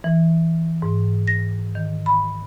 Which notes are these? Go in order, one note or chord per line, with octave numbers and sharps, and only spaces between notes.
E3
G#2
A#6
D#3
B5